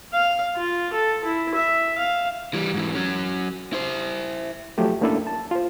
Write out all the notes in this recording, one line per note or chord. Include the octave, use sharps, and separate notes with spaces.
F5
F4
A4
E4
E5
F5
E3 G3
G#2 E3
F#3 C#4
E4 C5
F3 F#3 A3 G4
A3 A#3 C#4 D4 E4 A4
A5
F4 C5